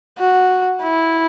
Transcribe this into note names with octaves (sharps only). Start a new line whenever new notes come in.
F#4
E4